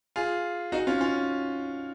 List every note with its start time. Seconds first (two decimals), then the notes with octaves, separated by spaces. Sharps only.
0.16 F4 G#4
0.72 D#4 F#4
0.87 C#4 F4
1.01 C#4 F4